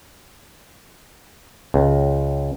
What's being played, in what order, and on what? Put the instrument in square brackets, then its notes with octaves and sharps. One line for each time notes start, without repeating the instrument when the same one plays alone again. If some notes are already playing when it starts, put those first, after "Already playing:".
[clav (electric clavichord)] C#2